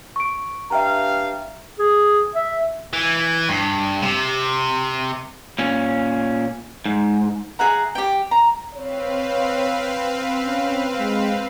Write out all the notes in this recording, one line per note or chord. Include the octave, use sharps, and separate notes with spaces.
C#6 D7
G2 E5 F5 G5 A#5
G#4
E5
E3
G2
C3
A#2 C#4
G#2
G#4 E5 F#5 A#5
G4 G5
A#5
C4 B4 C#5 F5
C#4
G#3